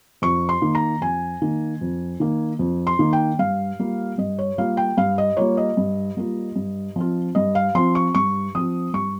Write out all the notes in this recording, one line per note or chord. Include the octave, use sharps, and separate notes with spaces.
F2 C#6
C6
D#3 A#3
A#5
F2 G#5
D#3 A#3
F2
D#3 A#3
F2
C6
D#3 A#3
G5
G2 F5
G3 A#3 F4
G2 D#5
C#5
G3 A#3 F4 F5
G5
G2 F5
D#5
G3 A#3 F4 C#5
D#5
G2
G3 A#3 F4
G2
F3 C4 F4
G2 D#5
F5
F3 C4 F4 C6
C#6
G2 C#6
F3 C4 F4 D#6
G2 C#6